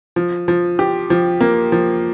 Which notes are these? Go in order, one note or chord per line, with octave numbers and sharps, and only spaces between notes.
F3
F3
G4
F3
A#3
F3